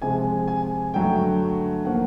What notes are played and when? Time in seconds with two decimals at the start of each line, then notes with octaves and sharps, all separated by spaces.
0.02 C3 F3 G#3 G#5
0.48 G#5
0.94 G2 D3 F#3 A3 G5
1.85 F3 A#3 F#5